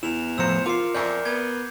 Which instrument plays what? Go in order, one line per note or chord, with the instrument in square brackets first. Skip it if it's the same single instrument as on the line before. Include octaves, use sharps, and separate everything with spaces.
[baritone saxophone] E2 [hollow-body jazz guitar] E4 [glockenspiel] E7 F7
[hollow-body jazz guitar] A2 F3 A#5 [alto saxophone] C5 [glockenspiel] E6 C#7
[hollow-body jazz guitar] F4 F5 [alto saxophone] A#4 [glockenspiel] D6 C7
[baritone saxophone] F2 [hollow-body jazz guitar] D5 E5 G#5 [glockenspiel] G6
[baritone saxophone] B3 [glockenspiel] G#6